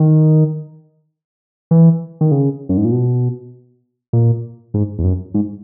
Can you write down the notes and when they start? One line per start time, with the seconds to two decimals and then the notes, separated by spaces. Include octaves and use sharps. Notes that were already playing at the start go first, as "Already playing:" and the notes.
Already playing: D#3
1.71 E3
2.21 D#3
2.31 C#3
2.69 F#2
2.77 G#2
2.85 A#2
2.92 B2
4.13 A#2
4.74 G#2
4.99 E2
5.04 F#2
5.34 G#2